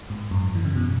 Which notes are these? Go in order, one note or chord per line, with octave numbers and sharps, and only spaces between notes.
G#2
F#2
E3
C#3
B2